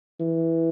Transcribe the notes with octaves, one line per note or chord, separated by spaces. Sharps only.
E3